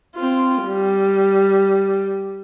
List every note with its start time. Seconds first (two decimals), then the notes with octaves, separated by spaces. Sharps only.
0.15 C4 F4
0.65 G3